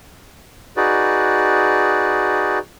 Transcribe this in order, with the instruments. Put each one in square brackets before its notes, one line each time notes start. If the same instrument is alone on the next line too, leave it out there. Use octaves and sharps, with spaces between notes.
[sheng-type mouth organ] D#4 F#4 G#4 B4 D5